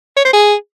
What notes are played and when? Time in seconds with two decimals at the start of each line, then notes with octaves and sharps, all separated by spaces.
0.17 C#5
0.25 C5
0.33 G#4